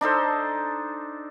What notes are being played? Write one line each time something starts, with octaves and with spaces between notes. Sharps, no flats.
D4 D#4 A4 C5